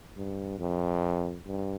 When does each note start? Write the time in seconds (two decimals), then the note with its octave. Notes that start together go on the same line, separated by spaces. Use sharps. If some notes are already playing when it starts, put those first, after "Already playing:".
0.17 G2
0.59 F2
1.47 G2